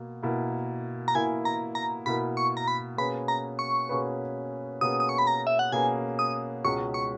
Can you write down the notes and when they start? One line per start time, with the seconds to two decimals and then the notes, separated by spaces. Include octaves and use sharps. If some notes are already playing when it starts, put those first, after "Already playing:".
Already playing: B2 A#3
0.23 B2 A#3 E4 A#4
1.08 A#5
1.15 B2 A#3 E4 A#4 G#5
1.45 A#5
1.75 A#5
2.06 B2 A#3 E4 A#4 B5
2.37 C#6
2.57 A#5
2.68 B5
2.97 B2 A#3 C#4 G#4 B4 B5
3.28 A#5
3.59 C#6
3.89 B2 A#3 C#4 G#4 B4
4.81 B2 A#3 C#4 G#4 B4 D#6
5.00 D#6
5.09 C#6
5.18 B5
5.27 A#5
5.47 E5
5.59 F#5
5.72 B2 A#3 C#4 G#4 B4 G#5
6.19 D#6
6.64 C#2 B2 G#3 C#4 C#6
6.94 C#6